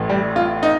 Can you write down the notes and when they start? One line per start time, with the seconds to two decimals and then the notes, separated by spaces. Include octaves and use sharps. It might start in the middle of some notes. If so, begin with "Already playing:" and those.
Already playing: A1 A2
0.09 G3
0.36 F4
0.63 D#4